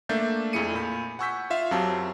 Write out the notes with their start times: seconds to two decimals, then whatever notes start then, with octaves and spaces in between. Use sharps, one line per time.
0.09 A3 A#3 D4 E5 G6 A6
0.53 F2 A3 E4 G#4 C#7 D#7
0.74 A#2 B5
1.19 F#5 G#5 C#6 E6 G6 B6
1.50 F4 E5 F5
1.71 F#2 F#3 C4 G4 A5 E6